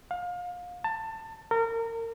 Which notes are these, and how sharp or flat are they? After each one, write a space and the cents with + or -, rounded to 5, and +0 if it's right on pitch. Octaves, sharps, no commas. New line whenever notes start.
F5 +30
A5 +20
A#4 -30